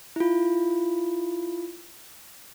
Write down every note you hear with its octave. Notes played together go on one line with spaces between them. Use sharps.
E4 F4